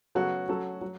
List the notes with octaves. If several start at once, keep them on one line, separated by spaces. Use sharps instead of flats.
C#3 F#3 B3 F#4 A4
F#3 C#4 A4
F#3